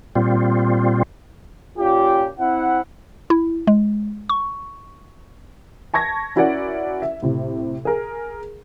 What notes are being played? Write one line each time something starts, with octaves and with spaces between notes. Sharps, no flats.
A#2 G3 C4 F4
A#2 C#4 F4 G4
C4 E4 F#5
E4
G#3
C#6
A5 C#6 G#6 A#6
C#4 E4 F#4 A#4 D5 F#5
E5
A2 C3
G#4 A#4